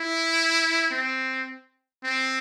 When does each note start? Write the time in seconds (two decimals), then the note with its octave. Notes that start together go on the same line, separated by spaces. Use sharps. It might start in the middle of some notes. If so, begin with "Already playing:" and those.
Already playing: E4
0.91 C4
2.04 C4